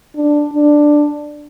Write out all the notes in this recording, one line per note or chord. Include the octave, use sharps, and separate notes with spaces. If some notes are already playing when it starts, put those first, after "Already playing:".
D4
D4